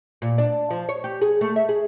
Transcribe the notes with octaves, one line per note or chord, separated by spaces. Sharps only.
A#2
D4
F3
C#5
G4
G#4
A3
E5
G#4